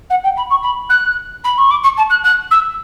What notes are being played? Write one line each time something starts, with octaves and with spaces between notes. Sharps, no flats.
F#5
G5
B5
C#6
B5
F#6
B5
C#6
D6
C#6
A5
F#6
F#6
E6